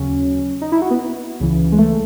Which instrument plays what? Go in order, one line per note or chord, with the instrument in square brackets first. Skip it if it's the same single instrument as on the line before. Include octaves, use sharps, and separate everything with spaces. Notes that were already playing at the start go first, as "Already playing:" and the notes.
Already playing: [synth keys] D#2 C#3 F#3 C#4
D#4
E4
F#4
B3
C#2 C#3 E3
G#3
A3